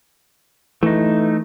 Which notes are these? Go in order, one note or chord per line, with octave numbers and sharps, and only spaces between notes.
E3 A3 D#4